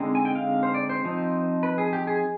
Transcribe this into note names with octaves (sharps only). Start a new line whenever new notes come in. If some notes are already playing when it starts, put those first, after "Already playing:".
Already playing: D3 G#3 C4 D#4
G#5
G5
F5
C5
D5
C5
F3 C4 D#4
B4
G#4
G4
G#4